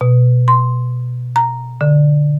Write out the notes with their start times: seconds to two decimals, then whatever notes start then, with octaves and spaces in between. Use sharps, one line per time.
0.01 B2
0.48 C6
1.36 A#5
1.81 D3